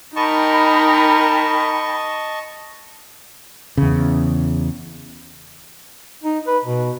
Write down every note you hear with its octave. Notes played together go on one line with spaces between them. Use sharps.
D#4 A#4 D#5 G5 A5 B5 C#6
E2 C#3
D#4
B4
B2